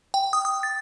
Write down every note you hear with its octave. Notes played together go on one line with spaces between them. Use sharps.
G5
D#6
D#6
A6